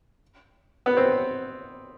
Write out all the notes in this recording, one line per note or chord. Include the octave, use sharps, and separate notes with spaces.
B3
C4